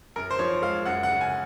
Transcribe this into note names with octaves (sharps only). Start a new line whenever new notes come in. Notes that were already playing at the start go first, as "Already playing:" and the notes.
F#2 A#4
C5
F3 C#5
G#3 F5
F#2 F#5
F#5
C#3
G#5